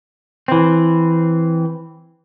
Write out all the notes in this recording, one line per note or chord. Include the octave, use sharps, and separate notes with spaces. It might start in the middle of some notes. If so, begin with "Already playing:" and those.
E3 C4